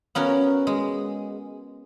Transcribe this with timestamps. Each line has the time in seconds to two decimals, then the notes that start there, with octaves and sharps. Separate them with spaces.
0.15 B3 C#4 F#4 A#4
0.67 G#3